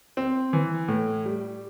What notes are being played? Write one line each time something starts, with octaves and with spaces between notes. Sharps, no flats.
C4
E3
A2
G3